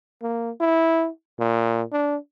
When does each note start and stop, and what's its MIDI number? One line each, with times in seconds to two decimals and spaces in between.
0.22 0.51 58
0.60 1.08 64
1.39 1.83 46
1.92 2.16 62